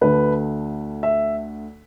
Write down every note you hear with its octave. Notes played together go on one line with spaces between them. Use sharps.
D2 D3 A3 B4
E5